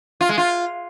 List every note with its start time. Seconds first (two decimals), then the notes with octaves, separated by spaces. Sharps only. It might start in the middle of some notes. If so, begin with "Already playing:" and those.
0.21 F4
0.29 G#3
0.38 F4